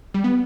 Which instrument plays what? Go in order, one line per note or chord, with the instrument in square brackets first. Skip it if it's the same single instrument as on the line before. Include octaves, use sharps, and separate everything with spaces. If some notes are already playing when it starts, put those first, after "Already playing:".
[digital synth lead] G3
B3